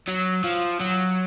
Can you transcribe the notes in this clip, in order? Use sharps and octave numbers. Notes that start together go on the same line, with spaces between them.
F#3
F3
F#3